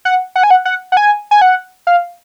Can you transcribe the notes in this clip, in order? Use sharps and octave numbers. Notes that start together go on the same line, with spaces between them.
F#5
F#5
G#5
F#5
F#5
F#5
G#5
G#5
F#5
F5